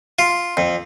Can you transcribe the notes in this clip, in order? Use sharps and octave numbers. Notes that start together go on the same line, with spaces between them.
F4
F2